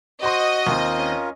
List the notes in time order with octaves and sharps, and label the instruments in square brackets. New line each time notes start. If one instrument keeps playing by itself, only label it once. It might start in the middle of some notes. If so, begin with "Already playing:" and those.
[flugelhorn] F#4 [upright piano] C5 C6 [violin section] D#5
[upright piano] D#2 C4 [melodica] F4 A#4
[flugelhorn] C#4